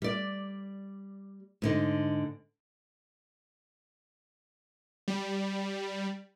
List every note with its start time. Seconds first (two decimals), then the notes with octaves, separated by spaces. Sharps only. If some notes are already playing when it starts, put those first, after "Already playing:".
0.02 G3 D5
1.62 G#2 D3 D#4
5.08 G3